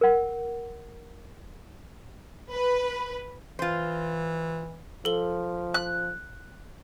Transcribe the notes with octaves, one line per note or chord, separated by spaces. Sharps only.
A#4 F#5
B4
E3 F4 C5
F3 A4 G7
F#6